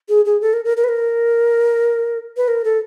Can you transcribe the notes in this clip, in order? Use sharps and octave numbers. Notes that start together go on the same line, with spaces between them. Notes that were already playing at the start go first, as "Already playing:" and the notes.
G#4
G#4
A4
A#4
A#4
A#4
B4
A#4
B4
A#4
A4